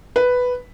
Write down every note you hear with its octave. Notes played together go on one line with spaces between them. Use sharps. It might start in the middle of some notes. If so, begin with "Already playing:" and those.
B4